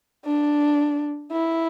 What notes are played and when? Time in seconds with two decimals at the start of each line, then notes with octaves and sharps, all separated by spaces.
0.26 D4
1.32 E4